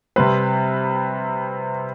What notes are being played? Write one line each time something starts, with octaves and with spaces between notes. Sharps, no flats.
C3 G3 C4 B4